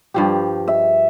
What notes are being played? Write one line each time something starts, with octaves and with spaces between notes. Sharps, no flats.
G2 F3 G4
E5